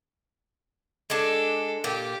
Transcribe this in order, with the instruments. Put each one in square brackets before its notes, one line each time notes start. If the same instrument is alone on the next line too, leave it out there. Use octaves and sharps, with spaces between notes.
[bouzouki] G#3 D4 [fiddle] A4
[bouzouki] A#2 [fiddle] G4